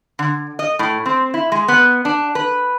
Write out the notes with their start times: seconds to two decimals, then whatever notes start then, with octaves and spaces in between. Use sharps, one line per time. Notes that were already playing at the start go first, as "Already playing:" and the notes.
0.19 D3
0.59 D#5
0.79 A2
1.06 C4
1.34 E4
1.52 G#3
1.68 B3
2.05 D4
2.35 B4